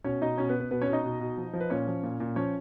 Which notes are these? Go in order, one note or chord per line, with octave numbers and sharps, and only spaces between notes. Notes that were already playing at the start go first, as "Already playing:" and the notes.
B2 C#4 C#5
B2 D#4 D#5
B2 C#4 C#5
B3 B4
B2
B3 B4
B2 B3 B4
C#4 C#5
B2
D#4 D#5
B2
B2
F3
F3
B4
A#2 C#4 C#5
F3
A#2
A#2
F3 C#4 C#5